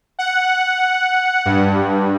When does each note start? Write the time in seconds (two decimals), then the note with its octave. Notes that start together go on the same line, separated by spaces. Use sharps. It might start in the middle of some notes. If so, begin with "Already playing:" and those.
0.19 F#5
1.46 G2